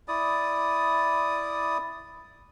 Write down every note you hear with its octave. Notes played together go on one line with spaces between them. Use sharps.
E4 D5 D#6